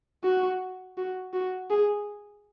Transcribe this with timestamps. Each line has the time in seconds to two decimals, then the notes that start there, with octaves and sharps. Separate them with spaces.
0.24 F#4
0.97 F#4
1.34 F#4
1.70 G#4